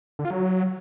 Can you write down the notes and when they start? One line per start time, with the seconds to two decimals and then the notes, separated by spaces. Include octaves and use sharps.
0.19 D3
0.25 F4
0.30 F#3